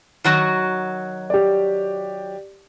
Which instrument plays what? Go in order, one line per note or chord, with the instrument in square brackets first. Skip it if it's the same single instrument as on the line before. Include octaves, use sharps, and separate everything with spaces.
[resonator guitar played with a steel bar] D#3 F#3 F#4
[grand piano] G4 D5